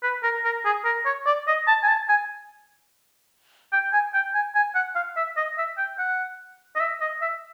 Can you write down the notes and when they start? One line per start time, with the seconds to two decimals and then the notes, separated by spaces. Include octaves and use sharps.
0.03 B4
0.23 A#4
0.45 A#4
0.65 G#4
0.85 A#4
1.06 C#5
1.27 D5
1.47 D#5
1.67 A5
1.83 G#5
1.88 A5
2.09 G#5
3.73 G5
3.93 G#5
4.14 G5
4.34 G#5
4.55 G#5
4.75 F#5
4.95 F5
5.17 E5
5.37 D#5
5.58 E5
5.78 G5
5.99 F#5
6.76 D#5
6.80 E5
7.01 D#5
7.22 E5